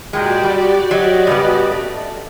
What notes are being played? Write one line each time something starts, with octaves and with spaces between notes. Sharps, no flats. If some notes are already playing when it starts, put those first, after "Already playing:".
A#2 G#3 F#4 G4 D5 G5
G3
F#3 D#5
G2 C#3 B3
A3